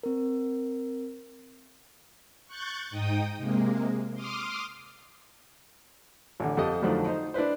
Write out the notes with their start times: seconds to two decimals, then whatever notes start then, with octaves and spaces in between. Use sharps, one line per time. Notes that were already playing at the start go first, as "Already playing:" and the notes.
0.03 C4 A#4
2.46 C#6 F#6 G6 A6
2.90 G#2 D#4 G5 D#6
3.37 C3 G#3 A#3
4.14 C6 D6 D#6 F6
6.40 A1 D3
6.57 F2 G4 A4 D#5
6.82 F2 D3 D#3 F3 F#3 A3
7.06 D#4 C5
7.34 D4 E4 B4 C5